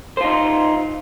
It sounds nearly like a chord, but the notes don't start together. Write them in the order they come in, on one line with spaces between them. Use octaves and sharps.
C5 F4 D#4